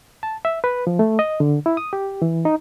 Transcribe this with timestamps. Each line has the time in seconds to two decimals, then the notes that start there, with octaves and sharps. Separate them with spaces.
0.23 A5
0.45 E5
0.64 B4
0.87 F3
0.99 A3
1.19 D#5
1.40 D3
1.66 E4
1.77 D#6
1.93 G4
2.22 E3
2.45 D#4